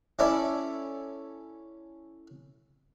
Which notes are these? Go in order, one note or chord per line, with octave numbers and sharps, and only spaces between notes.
C#4 E4 A4 D5